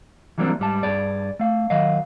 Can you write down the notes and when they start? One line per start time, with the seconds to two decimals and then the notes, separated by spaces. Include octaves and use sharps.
0.38 E3 F#3 G3 A#3 C4 D4
0.60 G#2 G3 A5
0.83 G2 G#4 D5
1.40 A3 F5
1.70 D#3 F#3 D#5 F5